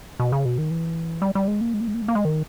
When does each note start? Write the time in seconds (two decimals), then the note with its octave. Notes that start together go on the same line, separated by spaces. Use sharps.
0.20 B2
0.32 C#3
0.45 B2
0.58 D#3
0.71 E3
1.22 G3
1.35 G3
1.48 G#3
1.61 A#3
1.74 G#3
1.80 A#3
1.87 G#3
1.94 A#3
2.02 G#3
2.08 A#3
2.15 G#3
2.25 D#3